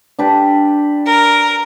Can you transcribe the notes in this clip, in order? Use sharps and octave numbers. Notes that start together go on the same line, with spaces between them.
D4 G4 B4
A#4